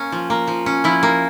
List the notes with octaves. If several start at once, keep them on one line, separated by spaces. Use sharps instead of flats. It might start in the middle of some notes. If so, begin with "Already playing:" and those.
Already playing: A#3 C#4
F3
A#3
F3
C#4
F3 E4
A#3